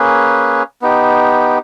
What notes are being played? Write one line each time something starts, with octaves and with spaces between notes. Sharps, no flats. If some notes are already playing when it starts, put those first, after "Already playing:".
Already playing: A#3 C#4 G#4 B4
B3 D#4 G4